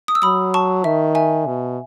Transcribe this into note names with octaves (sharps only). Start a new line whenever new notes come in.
D#6
E6
F#3 B5 D#6
A5 C#6
D#3 E5
E5 G#5
B2